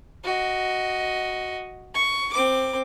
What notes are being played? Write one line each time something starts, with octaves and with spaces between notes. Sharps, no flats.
F#4 D#5
C#6
C4 D6